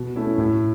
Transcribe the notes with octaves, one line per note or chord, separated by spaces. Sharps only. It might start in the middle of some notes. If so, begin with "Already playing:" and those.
Already playing: B2
A3 C#4 E4
A2